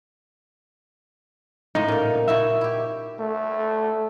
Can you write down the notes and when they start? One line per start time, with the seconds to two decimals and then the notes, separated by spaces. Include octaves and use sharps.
1.75 A2 C#3 G#3 D#4
1.88 A#2 A#4
2.28 D#4 E4 F#4 E5
2.61 E4 G4
3.19 A3